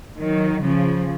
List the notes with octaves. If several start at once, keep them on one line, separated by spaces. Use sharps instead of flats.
D#3 F#3
C#3 F3